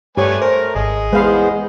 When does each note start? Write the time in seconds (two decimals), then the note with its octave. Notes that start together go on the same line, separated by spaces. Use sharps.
0.17 G2 A3 G4 B4 C#5 D5 G#5
0.42 A#4 C5
0.75 G#1 G#4 D#5
1.13 E2 G#3 B3 B4 C5 F5 B5